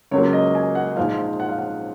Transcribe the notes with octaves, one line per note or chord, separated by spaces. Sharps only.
C#2 C#3 F#3 A#3 C#5
D#5
G#5
F#5
A#1 G#2 F3 F5
F#5
F5
F#5